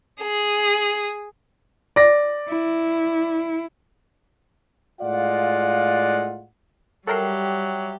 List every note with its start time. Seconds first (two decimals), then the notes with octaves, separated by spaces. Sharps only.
0.20 G#4
1.96 D5 A#6
2.49 E4
5.01 A2 G#3 F4 D5 F5 F#5
7.07 F#3 G3 G4 A4 A#4 E5 G5 C7